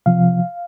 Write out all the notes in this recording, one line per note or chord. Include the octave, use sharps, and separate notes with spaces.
C3 F3 F5